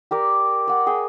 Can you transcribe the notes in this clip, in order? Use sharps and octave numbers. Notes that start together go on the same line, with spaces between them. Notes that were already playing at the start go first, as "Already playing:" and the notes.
G4 A#4 D5
D5 F#5
G#4 G5